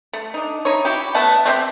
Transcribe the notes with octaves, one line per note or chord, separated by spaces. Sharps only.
A3
D4 D#4
D#4 E4 C#5
E4 F#4 G4
A3 B3 F#5 A5
A3 C4 G4 E5